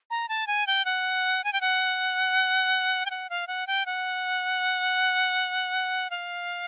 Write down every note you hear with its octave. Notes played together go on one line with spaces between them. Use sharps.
A#5
A5
G#5
G5
F#5
G#5
G5
F#5
G5
F#5
F5
F#5
G5
F#5
F5